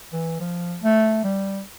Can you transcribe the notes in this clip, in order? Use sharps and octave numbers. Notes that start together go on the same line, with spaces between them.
E3
F3
A3
G3